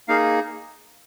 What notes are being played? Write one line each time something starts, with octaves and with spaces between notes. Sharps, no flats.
A#3 D#4 G#4 F5